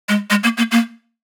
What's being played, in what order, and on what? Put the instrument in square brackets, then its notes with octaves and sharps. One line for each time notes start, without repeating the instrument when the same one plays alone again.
[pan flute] G#3
G#3
A#3
A#3
A#3